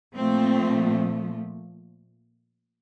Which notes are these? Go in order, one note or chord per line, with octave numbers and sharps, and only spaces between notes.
A#2 F3 A3 C4